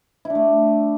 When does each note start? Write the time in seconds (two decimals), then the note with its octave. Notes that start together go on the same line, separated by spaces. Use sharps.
0.25 E4
0.30 D4
0.35 A3